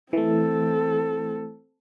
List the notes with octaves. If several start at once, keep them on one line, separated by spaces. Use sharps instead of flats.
E3 A3 C4 A4